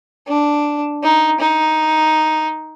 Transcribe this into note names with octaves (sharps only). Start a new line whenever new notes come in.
D4
D#4
D#4